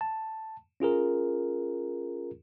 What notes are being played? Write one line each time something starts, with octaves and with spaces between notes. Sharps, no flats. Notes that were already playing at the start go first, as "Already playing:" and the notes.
A5
C#4 F4 G#4 A#4